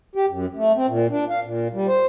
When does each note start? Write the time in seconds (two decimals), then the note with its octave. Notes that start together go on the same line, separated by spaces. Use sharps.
0.15 G4
0.29 F#2
0.56 A3
0.76 C4
0.87 A#2
1.10 D4
1.29 F5
1.44 A#2
1.73 G3
1.88 C5